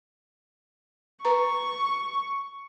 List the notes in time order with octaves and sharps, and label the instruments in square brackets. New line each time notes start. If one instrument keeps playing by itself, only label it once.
[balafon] B4 A#5 [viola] C#6